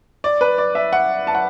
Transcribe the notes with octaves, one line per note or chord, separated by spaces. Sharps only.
D5
B4
D5
E5
F#5
A5
F#5